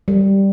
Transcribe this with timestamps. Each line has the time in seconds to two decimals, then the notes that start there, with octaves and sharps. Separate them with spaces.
0.08 G3